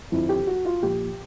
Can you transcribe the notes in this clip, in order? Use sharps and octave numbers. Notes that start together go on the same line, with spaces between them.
F2 D3 F3 E4
G4
F#4
F4
A#2 F3 G4